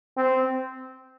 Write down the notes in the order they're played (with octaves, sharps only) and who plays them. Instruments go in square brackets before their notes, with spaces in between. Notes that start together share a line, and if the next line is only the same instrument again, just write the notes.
[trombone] C4